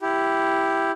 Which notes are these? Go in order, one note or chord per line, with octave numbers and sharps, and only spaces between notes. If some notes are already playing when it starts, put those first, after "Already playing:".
E4 G4